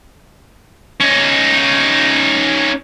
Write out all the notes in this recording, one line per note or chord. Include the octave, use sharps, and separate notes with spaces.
C#4 D#4